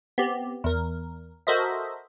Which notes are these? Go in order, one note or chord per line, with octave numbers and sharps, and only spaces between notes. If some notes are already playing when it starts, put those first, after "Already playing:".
B3 C4 G4
E2 A#4
F#4 A4 A#4 C5 D#5 E5